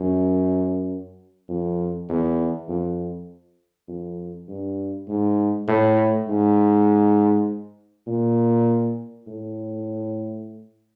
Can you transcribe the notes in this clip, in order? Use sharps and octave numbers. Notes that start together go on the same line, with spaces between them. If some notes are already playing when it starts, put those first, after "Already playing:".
Already playing: F#2
F2
E2
F2
F2
G2
G#2
A2
G#2
A#2
A2